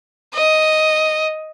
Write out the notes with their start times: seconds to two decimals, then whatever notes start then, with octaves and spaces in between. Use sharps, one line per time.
0.34 D#5